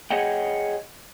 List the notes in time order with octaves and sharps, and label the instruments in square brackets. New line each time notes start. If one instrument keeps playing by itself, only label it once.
[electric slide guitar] G#4 C#5 D#5 F#5 G5